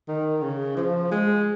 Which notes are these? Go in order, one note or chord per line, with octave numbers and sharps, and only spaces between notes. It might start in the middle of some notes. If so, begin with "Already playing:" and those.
D#3
C#3
F3
G#3